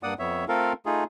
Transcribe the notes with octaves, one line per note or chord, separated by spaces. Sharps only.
G2 A#3 D5 F#5 D#6
F2 B3 C#5 E5
A3 C4 F4 A4 A#4 F5
A3 D#4 F4 G#4